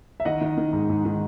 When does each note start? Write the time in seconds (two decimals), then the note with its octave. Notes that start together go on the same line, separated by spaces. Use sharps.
0.20 E5
0.25 D#3 D#5 F#5
0.41 D#3
0.58 D#3
0.73 G#2
0.90 G#2
1.05 D#3